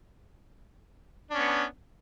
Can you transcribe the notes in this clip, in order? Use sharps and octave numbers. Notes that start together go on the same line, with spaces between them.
B3 C#4 D4